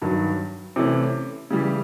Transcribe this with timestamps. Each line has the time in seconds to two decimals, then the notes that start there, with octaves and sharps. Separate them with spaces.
0.02 G2 D#3 F#3
0.76 C3 E3 A3 C#4
1.51 C#3 E3 G3